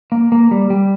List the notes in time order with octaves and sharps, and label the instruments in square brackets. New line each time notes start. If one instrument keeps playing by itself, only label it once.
[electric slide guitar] A#3
A#3
G3
G3